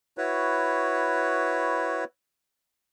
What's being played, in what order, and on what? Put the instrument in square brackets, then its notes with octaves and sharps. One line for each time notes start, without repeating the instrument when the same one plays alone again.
[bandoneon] E4 F#4 B4 C#5